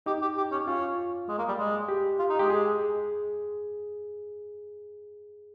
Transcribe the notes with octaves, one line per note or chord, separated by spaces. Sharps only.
D#4 G4
G4
G4
C#4
C#4 F4
G#3
A#3
G3
G#3
G4
F4
D#4
G#3 G4
G#3 G#4